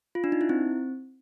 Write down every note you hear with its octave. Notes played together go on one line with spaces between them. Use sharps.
F4
D4
D#4
E4
C4